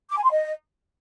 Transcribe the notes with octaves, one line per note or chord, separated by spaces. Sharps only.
D6
G#5
C6
D#5